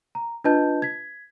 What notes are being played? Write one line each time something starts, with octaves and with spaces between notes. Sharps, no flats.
A#5
D4 F4 B4 D#5 A5 G6
G#6 B6